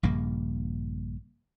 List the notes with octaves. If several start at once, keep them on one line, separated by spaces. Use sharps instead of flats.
A#1 G2 C#3 A#3